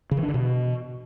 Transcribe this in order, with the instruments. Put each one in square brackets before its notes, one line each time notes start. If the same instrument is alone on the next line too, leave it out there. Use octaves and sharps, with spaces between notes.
[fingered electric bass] C#3
E3
D4
D3
B2